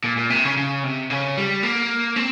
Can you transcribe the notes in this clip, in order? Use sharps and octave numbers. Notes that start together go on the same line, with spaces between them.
A#2
A#2
C3
C#3
C#3
C3
C#3
G3
A#3
C4